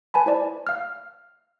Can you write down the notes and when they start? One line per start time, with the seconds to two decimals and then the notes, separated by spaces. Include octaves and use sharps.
0.14 B4 G#5 A5 B5
0.26 E4 C5 D5 A5
0.67 F5 F6